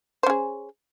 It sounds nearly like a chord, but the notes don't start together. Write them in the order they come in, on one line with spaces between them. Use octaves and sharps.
C5 C#4 G#4